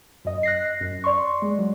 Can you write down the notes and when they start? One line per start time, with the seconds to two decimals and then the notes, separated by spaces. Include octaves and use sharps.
0.25 F#2 D#5
0.43 F#6 A#6 C7
0.81 F#2
1.04 D5 C6 C#6
1.42 G#3
1.59 F#3